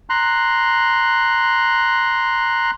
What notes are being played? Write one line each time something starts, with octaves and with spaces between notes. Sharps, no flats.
A#5 C6 F#6